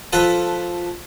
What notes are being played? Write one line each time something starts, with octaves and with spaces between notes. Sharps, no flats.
F3 F4 A4 B4